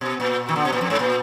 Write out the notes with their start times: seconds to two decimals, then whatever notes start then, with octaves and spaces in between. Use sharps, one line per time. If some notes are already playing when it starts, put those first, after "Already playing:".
0.01 B2
0.20 A#2
0.49 D#3
0.56 D3
0.65 B2
0.73 A#2
0.81 F2
0.90 G#2
0.99 A#2